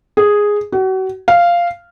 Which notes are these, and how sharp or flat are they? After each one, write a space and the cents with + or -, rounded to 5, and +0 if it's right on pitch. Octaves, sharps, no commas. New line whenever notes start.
G#4 -5
F#4 +35
F5 -10